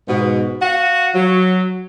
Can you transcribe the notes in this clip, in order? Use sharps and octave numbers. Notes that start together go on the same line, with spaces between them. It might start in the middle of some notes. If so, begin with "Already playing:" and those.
G#2 B2
F#4 F5 F#5
F#3